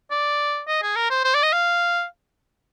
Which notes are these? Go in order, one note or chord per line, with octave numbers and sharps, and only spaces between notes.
D5
D#5
G#4
A#4
C5
C5
D5
D#5
F5